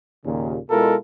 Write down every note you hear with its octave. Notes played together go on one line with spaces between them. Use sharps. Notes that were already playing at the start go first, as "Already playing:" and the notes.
D#2 A#2 C#3
B2 G#3 E4 F4 A4 A#4